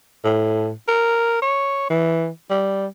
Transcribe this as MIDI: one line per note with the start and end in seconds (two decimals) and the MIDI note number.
0.24 0.71 45
0.88 1.41 70
1.42 1.86 73
1.90 2.28 52
2.50 2.86 55